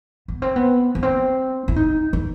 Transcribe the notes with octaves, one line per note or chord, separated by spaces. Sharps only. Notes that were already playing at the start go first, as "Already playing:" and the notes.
B3
C4
B3
B3
C4
E4
D#4
D#4